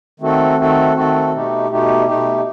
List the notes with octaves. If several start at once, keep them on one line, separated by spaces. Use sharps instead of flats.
D#3 A3 C4 F#4 A4
D#3 A3 C4 F#4 A4
D#3 A3 C4 F#4 A4
B2 A3 D#4 G4
B2 A3 D#4 G4
B2 A3 D#4 G4